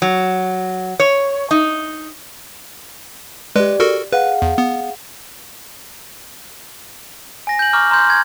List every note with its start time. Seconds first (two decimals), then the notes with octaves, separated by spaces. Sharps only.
0.02 F#3
1.00 C#5
1.51 D#4
3.56 G#3 G4 B4 D5
3.80 F#4 A4 A#4
4.13 G#4 B4 F5 F#5
4.42 E2
4.58 B3
7.47 G#5 A#6
7.59 G6 F#7
7.73 A#5 C#6 D6 F6
7.91 A#5 C6 G6
8.10 G#6